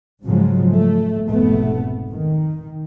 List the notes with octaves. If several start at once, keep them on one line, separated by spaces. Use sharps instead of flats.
G#2 C#3 F3 F#3 G#3
A3
F1 B1 G#2 A3 B3
D#3